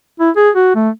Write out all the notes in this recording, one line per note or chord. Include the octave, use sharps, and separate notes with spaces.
E4
G#4
F#4
A3